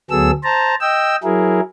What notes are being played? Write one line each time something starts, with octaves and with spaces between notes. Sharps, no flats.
D2 F#3 B3 G#4 A4 E6
C5 A5 A#5
D#5 G5 E6
F#3 E4 G#4 A#4